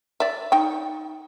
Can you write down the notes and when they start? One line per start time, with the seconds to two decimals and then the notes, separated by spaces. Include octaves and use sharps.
0.20 D5 E5
0.52 D#4 G5